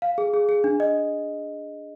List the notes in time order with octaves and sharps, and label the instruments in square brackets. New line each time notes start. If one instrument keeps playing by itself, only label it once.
[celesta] F5
G#4
G#4
G#4
D4
D#5